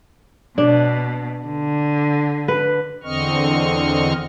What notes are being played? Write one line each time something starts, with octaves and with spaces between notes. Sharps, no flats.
B2 D4
D3
B4
E2 D3 C4 D#5 C#6 F6